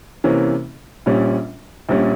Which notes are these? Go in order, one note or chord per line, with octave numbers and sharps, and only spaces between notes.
C3 E3 A#3 C#4
A#1 A#2 G3 C#4
A#1 A#2 G3 C#4